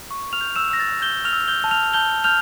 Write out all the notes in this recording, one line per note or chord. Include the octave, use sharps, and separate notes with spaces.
C#6
F6 F7
G6
E6 E7
E6 A#6
A6
G6 G7
F6 F7
E6
G6 G7
A5
F6 F7
A5 G6 G7
F6 G6 F7